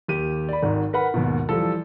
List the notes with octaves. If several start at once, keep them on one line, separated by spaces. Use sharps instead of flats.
D#2 G4 D#7
D5 B5
G#1 G#2 D#3
A#4 B4 F#5 B5
D#2 G#2 B2
E3 F3 G3 A4